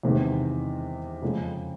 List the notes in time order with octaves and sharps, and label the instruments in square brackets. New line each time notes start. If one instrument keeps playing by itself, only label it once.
[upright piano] E2 C3 D#3 G#3
F2 C#3 F3 G#3